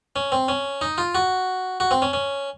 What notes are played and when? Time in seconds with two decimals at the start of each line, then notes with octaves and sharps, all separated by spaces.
0.16 C#4
0.32 C4
0.48 C#4
0.81 D#4
0.98 F4
1.15 F#4
1.80 F#4
1.91 C4
2.02 C#4
2.13 C#4